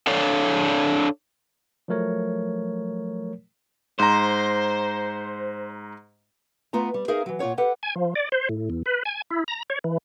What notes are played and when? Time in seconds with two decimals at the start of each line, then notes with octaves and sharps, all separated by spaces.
0.07 D4 A4 C#5 D5 F5
1.88 F3 F#3 A3 A#4 C#5
4.00 G#2 C5 A#5
6.73 A3 B3 F4 A#5
6.94 G3
7.08 D#4 G#4 A#4 E5 F5
7.26 E3 F#3
7.39 A#2 F4 B4 C#5 F#5
7.58 G4 A4 B4 F#5
7.83 G#5
7.96 F3
8.15 D5
8.32 C5
8.49 A2
8.70 E2
8.86 B4
9.05 G#5
9.30 E4
9.48 A#5
9.70 C#5
9.84 E3